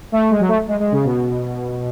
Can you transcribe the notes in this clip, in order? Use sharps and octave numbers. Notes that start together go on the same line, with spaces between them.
A3
G#3
F#3
A3
G#3
G#3
C#3
B2